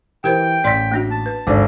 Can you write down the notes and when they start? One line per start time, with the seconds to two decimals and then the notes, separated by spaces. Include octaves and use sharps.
0.24 E3 G4 A#4 C5 G5
0.64 A1 D5 C6 B6
0.92 A#3 D4 F#4
1.11 A5
1.26 B4
1.47 G#1 D3 D5 D6